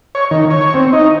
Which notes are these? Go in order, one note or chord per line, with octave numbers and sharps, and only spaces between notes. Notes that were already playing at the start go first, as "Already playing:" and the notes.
C#5
D#3
C#5
C4
D#4